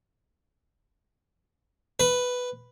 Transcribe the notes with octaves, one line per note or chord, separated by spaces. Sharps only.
B4